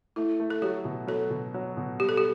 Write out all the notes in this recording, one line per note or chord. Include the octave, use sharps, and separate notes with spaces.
A3 E4
A3
A4
F#3 G4
B2
F#3 A4
B2
F#3
B2
G3 G4
A4
G4